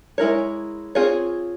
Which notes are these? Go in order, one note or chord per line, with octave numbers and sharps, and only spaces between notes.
G#3 E4 A#4 C#5
C4 F4 G#4 C#5